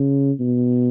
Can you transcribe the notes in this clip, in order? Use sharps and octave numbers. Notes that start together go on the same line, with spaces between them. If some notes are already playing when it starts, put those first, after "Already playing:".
Already playing: C#3
B2